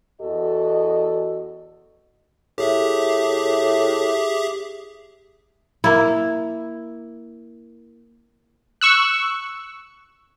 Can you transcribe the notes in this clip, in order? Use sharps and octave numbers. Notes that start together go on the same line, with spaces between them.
E2 F#4 A4 D#5
A2 G4 G#4 E5
A#3 E4
C#6 E6 F#6